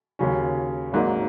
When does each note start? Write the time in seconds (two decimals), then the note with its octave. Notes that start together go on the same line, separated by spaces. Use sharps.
0.19 D#2 C#3 F#3 C#4
0.93 G#1 G#2 F#3 A#3